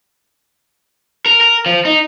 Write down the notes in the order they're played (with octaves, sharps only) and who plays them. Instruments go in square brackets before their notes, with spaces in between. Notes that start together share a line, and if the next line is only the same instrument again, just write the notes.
[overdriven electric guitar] A#4
A#4
F3
D#4